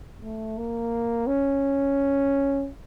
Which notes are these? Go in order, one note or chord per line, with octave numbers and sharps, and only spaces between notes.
A3
A#3
C#4